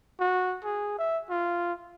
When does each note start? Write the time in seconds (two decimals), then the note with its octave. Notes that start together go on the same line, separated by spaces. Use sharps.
0.20 F#4
0.64 G#4
0.99 E5
1.30 F4